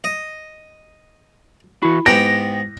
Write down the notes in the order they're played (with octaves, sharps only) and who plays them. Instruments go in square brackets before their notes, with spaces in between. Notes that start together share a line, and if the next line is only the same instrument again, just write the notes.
[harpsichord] D#5
[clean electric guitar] E3 F#4 [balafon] E4
[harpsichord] G#2 B3 G4 [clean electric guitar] G5 [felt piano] A#6